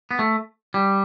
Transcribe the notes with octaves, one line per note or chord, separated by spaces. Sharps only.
B3
A3
G3